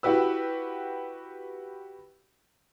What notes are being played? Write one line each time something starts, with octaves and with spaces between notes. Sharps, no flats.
E4 F#4 G4 B4 E6